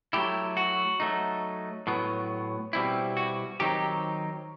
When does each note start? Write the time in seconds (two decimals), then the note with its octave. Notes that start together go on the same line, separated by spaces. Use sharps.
0.13 F#3 A3 E4 G4
0.57 F#4
1.00 F#3 A3 D#4
1.87 A2 F#3 B3
2.73 B2 G3 C4 E4
3.17 F#4
3.60 D#3 F#3 C4 D#4 G4